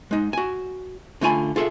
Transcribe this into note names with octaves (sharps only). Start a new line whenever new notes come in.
G#3 D#4
F#4 G#5
D3 A3 F4 G#5 B5
F4 G#4 A4 D5 E5